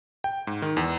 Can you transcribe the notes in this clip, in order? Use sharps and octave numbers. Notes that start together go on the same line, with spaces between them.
G5
G#2
D#3
E2